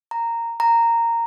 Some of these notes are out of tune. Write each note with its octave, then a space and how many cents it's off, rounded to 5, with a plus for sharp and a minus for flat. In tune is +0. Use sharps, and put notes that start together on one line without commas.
A#5 -10
A#5 -10